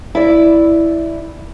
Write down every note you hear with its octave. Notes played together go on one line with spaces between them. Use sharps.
E4 D5